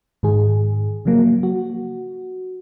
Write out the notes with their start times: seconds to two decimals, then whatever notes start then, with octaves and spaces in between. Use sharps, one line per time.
0.23 G#2 D#3 G#3 G#4
1.05 C#3 F3 F#3 A#3
1.43 F#4